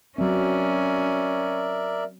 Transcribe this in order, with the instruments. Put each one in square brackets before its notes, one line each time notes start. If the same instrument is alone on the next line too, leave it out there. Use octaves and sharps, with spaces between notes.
[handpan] F#3 C4 [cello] C#4 [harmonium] A#4 D5 E5